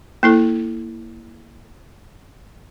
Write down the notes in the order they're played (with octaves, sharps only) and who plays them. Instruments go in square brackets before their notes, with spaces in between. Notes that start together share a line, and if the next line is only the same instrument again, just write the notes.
[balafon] A#3 E4 A4